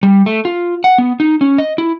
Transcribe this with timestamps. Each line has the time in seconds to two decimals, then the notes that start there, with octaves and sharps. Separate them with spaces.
0.03 G3
0.26 A3
0.45 F4
0.84 F#5
0.98 B3
1.20 D#4
1.41 C#4
1.58 D#5
1.78 E4